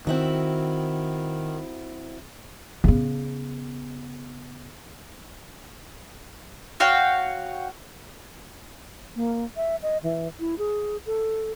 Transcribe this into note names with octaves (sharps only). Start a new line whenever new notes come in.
D#3 C4 E4 F#4
C#3 B3
F#4 C#5 F5 G5
A#3
E5
D#5
E3
E4
G#4
A4